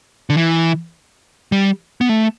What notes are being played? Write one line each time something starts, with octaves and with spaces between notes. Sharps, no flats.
D3
E3
G3
B3
A3